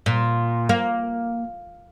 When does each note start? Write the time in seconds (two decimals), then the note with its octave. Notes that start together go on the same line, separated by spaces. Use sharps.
0.06 A#2
0.69 A#3